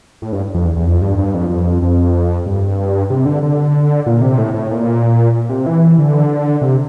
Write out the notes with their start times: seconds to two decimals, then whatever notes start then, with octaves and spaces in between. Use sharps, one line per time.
0.22 A2
0.32 G2
0.54 F2
0.65 E2
0.76 E2
0.86 F2
1.02 G2
1.18 G2
1.34 F2
1.50 F2
1.82 F2
2.46 G2
3.10 C3
3.25 D3
3.43 D3
4.06 A#2
4.21 C3
4.38 A2
4.54 A2
4.71 A#2
5.49 C3
5.66 E3
5.99 D3
6.61 C3